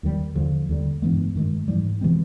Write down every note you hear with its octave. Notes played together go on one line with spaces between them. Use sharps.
D#2 D#3 G3
D#2 D3 F3
D#2 D3 G3
G2 E3 G#3 B3
G2 D#3 G#3
G#2 E3 G3
C3 E3 G#3 C4